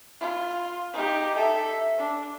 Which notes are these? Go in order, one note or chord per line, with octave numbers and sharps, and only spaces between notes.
F4
D#4 G4
A4 E5
D4